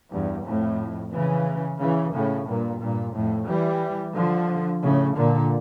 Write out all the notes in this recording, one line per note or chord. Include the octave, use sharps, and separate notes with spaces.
E2 G2
F2 A2
C#3 E3
C#3 E3
A2 C#3
G2 A#2
G2 A#2
F2 A2
E3 G3
D3 F3
A2 C#3
A#2 D3